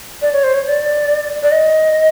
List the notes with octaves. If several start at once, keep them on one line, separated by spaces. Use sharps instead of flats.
D5
C#5
C5
C#5
D5
D5
D#5